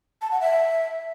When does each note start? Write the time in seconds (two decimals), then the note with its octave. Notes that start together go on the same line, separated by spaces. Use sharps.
0.22 A5
0.31 F#5
0.41 E5